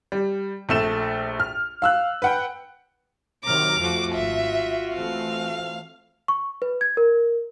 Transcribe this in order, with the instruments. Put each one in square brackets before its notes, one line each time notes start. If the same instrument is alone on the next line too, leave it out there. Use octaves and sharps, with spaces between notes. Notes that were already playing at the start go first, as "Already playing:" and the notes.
[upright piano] G3
A#1 A3 E7
F6
F5 E6 F#6
B4 F#5 G5
[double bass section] C3 D#3 F#3 [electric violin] A#5 F6 [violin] D6
[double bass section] F2 F3 A3 [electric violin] F4 F#4
[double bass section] G#1 [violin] E5
[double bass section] E3 A3 C4 [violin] F5
[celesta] C#6
B4
G#6
A#4